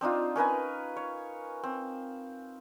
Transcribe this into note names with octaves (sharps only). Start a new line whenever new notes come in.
C4 D4 D#4 F4
C#4 A#4 B4 G#5
C#5
C4